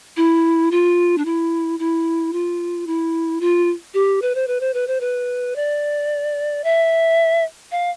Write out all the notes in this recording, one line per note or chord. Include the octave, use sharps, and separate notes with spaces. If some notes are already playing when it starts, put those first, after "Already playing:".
E4
F4
D4
E4
E4
F4
E4
F4
G4
B4
C5
B4
C5
B4
C5
B4
D5
E5
F5